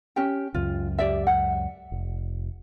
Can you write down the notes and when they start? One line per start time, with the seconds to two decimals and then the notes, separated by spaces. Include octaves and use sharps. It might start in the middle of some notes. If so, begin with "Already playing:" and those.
0.16 C#4 G4 G5
0.54 C#2 F#2 F4
0.99 G4 D5 E5
1.27 F#5
1.92 F1